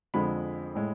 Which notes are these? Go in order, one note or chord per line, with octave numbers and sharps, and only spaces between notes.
F2 D3 F3 G#3 B5
A2 G#3